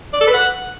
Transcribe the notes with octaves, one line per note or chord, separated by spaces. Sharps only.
D5
A4
B4
F#5